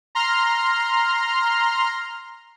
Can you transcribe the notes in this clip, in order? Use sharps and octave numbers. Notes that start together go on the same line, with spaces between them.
A#5 C6 F6